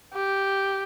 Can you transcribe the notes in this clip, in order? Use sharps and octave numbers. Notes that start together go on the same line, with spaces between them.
G4